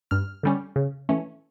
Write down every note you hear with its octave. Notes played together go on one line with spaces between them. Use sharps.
G2 F6
D3 G3 C#4
C#3
E3 A3 C#4